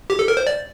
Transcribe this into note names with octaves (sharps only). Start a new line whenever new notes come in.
G4
A4
A#4
C5
D5